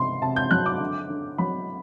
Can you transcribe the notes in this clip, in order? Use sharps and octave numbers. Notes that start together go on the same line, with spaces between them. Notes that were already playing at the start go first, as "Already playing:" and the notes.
Already playing: C3 C6
C3 A5
G6
F#3 F#6
D6
D3
D3
F#3 B5